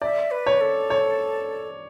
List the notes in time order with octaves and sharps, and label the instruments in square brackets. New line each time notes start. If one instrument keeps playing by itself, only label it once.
[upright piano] D5 [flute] E5
[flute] B4
[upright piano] C#5
[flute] A4
[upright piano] C#5